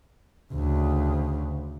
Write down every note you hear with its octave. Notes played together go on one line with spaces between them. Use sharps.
D2 C#3